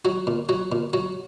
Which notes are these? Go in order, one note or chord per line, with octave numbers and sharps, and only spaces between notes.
F#3 F#4
A#2
F#3 F#4
A#2
F#3 F#4